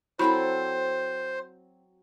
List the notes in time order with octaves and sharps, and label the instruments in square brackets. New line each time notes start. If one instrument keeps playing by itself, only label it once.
[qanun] F#3 C4 A4 [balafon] E4 B5 [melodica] C5